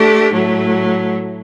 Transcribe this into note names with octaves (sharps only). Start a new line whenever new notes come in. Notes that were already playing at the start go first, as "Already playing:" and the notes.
Already playing: A3 D4 G4
A2 F#3 A3